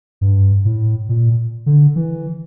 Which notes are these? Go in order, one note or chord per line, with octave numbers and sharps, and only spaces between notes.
G2
A2
A#2
D3
E3